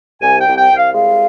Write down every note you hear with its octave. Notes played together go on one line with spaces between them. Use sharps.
C2 G#5
G5
C2
G5
C2
F5
G#3 F5